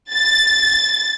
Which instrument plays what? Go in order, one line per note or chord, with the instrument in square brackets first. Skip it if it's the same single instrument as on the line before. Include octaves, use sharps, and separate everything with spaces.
[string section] A6